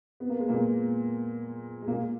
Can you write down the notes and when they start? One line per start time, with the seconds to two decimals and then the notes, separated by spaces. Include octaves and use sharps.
0.20 B3
0.29 A#3
0.39 G#3
0.48 A#2 A#3
1.82 G#3
1.88 A#2 A#3